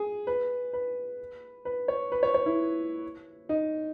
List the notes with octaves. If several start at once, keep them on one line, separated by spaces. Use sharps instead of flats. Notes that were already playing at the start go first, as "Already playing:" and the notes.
Already playing: G#4
B4
B4
B4
C#5
B4
C#5
C#5
E4
D#4